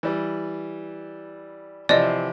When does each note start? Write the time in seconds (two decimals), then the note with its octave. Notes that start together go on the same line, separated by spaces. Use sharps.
0.03 E3 G3
1.89 C3 E3 F3 D5 D#5